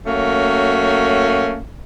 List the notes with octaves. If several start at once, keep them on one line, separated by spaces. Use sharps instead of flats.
F#3 A3 A#3 C#4